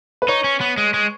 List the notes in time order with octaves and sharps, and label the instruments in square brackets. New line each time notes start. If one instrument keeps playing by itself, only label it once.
[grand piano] B4
[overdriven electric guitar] D#4 [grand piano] C#5
[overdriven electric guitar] C#4
B3
G#3
G#3